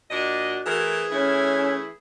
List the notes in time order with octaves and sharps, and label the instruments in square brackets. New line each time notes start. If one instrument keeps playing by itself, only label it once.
[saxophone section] A#2 D4 D#5 [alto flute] F#4
[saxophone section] E3 A3 A#4 [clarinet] G#4
[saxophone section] E3 A3 E4 [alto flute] C#4